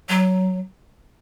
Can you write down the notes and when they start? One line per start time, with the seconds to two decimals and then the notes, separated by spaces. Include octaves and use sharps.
0.09 F#3